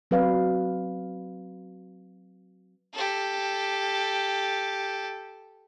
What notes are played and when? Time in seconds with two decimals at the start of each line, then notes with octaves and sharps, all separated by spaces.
0.11 F#3 C4 B4 D5 F5
2.94 G4 A4